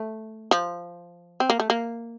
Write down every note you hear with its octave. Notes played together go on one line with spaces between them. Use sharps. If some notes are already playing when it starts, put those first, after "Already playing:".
Already playing: A3
F3
C4
A#3
A3
A#3